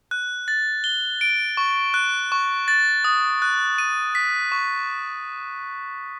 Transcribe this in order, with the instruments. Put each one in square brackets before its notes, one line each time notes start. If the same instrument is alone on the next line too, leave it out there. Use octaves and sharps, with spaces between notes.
[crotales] F#6
A6
G7
D7
C#6
F#6
C#6
A6
D#6
F#6
D#7
B6
C#6